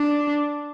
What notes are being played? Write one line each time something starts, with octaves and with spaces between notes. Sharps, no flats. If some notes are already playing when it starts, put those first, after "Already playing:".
Already playing: D4